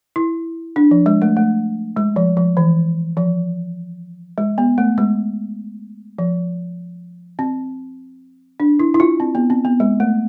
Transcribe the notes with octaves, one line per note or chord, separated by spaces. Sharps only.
E4
D4
F3
G#3
A3
A3
G#3
F3
F3
E3
F3
G#3
B3
A3
G#3
F3
C4
D4
E4
E4
F4
C4
B3
C4
B3
G#3
A3